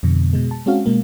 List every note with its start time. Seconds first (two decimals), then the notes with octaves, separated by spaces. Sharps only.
0.03 F2 B2 D3
0.33 B2 G#3
0.51 A5
0.66 G#3 C4 C#4 F#4 F5
0.86 B2 G#3 A#3